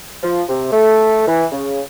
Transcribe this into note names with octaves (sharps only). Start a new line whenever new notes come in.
F3
C3
A3
E3
C#3